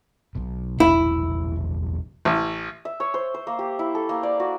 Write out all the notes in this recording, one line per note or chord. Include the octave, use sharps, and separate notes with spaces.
B1 B2
E1 A#1 E4
A1
E5
C#5
C5
C5
A#3
G4
E4
A4
A#3
D5
F#4